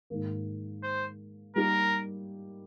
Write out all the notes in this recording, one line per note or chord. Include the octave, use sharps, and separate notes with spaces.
G#2 D#3 A#3
C5
G3 A#3 D#4 G4 A#4